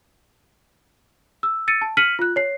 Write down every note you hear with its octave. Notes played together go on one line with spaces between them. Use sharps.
E6
E6 A6 C#7 D#7
A5
F6 B6 C#7 D#7 F#7
F4 F#6
C#5 C7